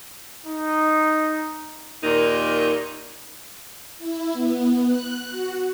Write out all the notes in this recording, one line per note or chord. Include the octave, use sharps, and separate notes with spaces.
D#4
D#2 A#2 D#4 A#4
E4
B3
F#6
F#4